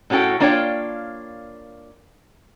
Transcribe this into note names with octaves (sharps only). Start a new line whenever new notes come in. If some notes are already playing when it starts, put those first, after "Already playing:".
A2 C#4 F#4 A4 G5
A#3 D4 F4 C#5 D5 G5